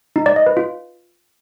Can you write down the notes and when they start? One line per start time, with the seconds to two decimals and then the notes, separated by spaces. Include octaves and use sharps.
0.16 D#4
0.26 D5
0.36 D#5
0.46 B4
0.57 F4